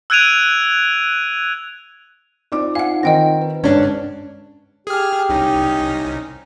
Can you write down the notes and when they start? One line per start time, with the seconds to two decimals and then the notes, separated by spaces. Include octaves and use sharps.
0.10 E6 F#6 G#6 D7 D#7 F7
2.52 C4 D#4 F4 D5 D6
2.75 D#4 F4 F5 F#5 G#5
3.03 D#3 C4 D#5 G5 A#6
3.42 B4
3.64 G1 G#2 C#4 D4 G#6
4.87 G4 G#4 F6
5.29 C2 C#4 D#4